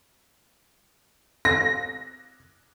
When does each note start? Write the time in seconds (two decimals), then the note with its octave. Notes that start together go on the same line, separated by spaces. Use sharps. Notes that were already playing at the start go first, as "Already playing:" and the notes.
1.45 A#6